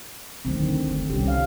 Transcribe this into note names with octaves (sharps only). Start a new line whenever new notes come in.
D2 D3 D#3 F#3 C4
F#1 D2
C2 C#4 G4
F5